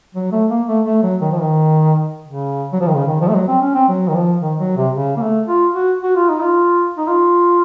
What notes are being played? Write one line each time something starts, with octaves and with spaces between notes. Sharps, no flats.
F#3
A3
A#3
A3
A3
F#3
D#3
F3
D#3
C#3
F#3
F3
D#3
C#3
D#3
F3
A3
F#3
C4
C#4
C4
F#3
D#3
F3
D#3
F#3
C3
C#3
A#3
A3
F4
F#4
F#4
F4
D#4
F4
D#4
F4